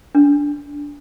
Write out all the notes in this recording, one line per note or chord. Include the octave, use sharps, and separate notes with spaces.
D4